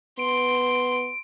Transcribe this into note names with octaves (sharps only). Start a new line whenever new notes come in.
B3 C6 D7